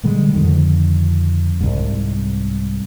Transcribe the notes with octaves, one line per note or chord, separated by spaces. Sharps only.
A#2 D3 G3 G#3
F2 D3 D#3
C2 G#2